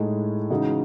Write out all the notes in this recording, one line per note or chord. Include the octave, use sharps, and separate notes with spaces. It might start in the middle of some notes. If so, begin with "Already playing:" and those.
Already playing: A2 G#3 D#4 A4 D#5
C#3 E3 G#3 D#4 F#4